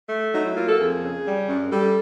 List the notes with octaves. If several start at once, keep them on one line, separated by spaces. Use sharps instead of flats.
A3
F#3 D#4
E4
A#3 F4
A4
F2 G#4
C#3
G3
F#2
G3 A4